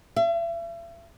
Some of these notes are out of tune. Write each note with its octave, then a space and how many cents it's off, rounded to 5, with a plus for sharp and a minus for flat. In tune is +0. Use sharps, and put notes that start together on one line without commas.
E5 +40